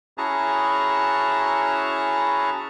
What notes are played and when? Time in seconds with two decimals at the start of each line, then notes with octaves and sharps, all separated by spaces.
0.18 C#4 E4 F#4 G#4 A5 A#5